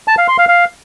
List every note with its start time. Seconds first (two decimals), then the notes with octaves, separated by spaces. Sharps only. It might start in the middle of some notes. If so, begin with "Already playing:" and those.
0.08 A5
0.18 F5
0.28 C6
0.38 F5
0.48 F5